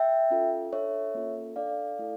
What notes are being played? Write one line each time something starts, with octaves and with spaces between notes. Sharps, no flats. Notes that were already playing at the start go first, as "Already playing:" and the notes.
Already playing: E5 G5
C#4 F4 A4
D4 A4 C#5 E5
A#3 C#4 F4 A4
D4 A4 D5 F5
A3 E4 A4